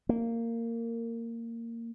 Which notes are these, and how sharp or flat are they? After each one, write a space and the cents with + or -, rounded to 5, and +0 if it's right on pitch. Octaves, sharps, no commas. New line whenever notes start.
A#3 -15